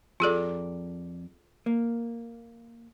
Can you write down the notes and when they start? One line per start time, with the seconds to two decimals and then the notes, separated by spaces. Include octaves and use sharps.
0.20 F2 F4 G#4 A4 D5
1.66 A#3